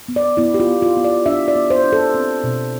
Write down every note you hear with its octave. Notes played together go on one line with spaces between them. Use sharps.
B3
D5
B3 E4
G4
F4
B3
F4
B3
D5
D4 E5
D5
B3
C5
D4
A4
C4
B2